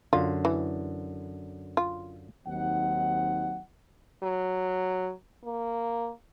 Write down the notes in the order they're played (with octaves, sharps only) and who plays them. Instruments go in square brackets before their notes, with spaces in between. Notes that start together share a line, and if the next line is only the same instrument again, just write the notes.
[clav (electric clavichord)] F#2 D3 [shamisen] F4
[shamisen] E3
F4
[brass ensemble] D#2 F#3 C4 D#4 F#5
[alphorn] F#3
A#3